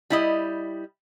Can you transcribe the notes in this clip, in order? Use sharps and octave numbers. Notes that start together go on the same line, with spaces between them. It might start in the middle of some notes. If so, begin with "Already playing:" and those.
G3 E4 D#5